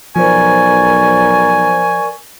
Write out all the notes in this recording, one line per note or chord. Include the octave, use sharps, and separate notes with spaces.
B1 F3 A#4 C5 D5 G#5 C#6